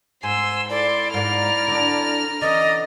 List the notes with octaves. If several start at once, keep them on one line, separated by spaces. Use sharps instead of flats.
G#2 G#5 C6 E6
E4 A4 D5 C6
G#2 A#3 D5 A#5 F6
D3 D4
D3 E3 C#4 D5 D#5